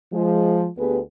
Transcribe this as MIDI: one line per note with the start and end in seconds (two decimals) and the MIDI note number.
0.13 0.67 53
0.13 0.67 56
0.77 0.99 38
0.77 0.99 59
0.77 0.99 67
0.77 0.99 68
0.77 0.99 71